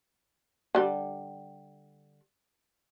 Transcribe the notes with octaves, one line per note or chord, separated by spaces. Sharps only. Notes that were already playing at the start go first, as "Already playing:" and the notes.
D3 G3 G4